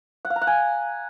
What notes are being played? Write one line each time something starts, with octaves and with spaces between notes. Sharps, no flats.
F#5
F5
A#5
F#5
G#5